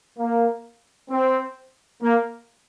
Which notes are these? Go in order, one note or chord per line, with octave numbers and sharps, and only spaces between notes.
A#3
C4
A#3